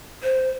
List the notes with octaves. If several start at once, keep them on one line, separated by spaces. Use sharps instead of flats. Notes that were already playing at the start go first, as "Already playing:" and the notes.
C5